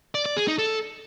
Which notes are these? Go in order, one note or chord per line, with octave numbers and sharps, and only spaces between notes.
D5
D5
G#4
D#4
A4